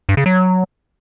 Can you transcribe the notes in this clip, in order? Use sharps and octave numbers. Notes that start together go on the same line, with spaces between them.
G2
C#3
F#3